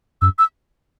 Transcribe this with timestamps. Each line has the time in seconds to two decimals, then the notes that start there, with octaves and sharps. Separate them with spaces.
0.22 F#2 E6
0.39 E6